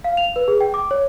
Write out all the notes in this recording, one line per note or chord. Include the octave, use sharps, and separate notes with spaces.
F5
F7
B4
G#4
G5
D6
C#5